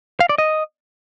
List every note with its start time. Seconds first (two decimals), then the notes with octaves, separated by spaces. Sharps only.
0.20 F5
0.29 D5
0.38 D#5